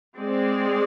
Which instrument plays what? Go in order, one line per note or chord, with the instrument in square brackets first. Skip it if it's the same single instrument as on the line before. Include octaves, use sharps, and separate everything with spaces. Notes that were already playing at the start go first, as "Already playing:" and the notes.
[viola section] G#3 C4 G#4 D5